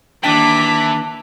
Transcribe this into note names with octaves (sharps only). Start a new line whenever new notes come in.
D#2 E3 D4 G5 A5 D6 B6